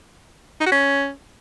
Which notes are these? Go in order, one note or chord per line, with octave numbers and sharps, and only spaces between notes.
D#4
F#4
C#4